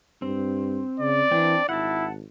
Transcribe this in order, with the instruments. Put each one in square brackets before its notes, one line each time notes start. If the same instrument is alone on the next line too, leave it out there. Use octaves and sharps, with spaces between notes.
[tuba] G2 [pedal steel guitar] C4
[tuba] C#3 [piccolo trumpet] D5
[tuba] E3 [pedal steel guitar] C4 D4
[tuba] G#1 [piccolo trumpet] E4 [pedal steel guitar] F#5 A5